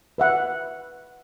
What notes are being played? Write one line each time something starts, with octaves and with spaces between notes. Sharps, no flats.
B4 E5 F#5